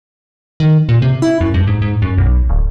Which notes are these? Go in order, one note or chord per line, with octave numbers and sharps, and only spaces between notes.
D#3
A#2
C3
E4
F#2
G2
G#2
G#2
F#2
B1
D1